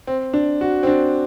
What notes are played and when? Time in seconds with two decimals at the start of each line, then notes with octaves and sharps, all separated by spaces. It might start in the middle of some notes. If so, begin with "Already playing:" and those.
0.07 C4
0.34 D4
0.61 F#4
0.83 C4
0.87 D4